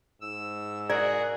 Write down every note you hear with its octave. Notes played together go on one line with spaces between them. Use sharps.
G#2 E6
F#4 G#4 A#4 D5 F#5